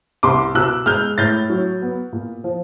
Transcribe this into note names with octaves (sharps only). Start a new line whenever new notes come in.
C2 C6 D6
B2 E6 F#6
G#3 F6 G6
A2 G6 A6
F#3
B3
A#2
F3